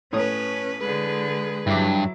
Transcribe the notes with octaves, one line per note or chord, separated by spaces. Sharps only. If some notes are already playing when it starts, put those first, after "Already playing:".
A2 C#4 B4 C#5 D#6
D3 G#3 G#4 B4
G2 F#3 E4 E5 D6